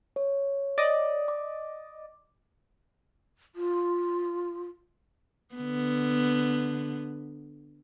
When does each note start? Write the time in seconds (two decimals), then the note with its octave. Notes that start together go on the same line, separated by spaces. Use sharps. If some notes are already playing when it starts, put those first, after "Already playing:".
0.16 C#5
0.78 D5 D#5
1.28 D6
3.56 F4
5.55 D3 B3